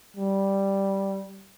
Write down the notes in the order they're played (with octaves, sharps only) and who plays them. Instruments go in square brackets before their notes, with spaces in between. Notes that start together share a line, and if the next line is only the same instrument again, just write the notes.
[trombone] G3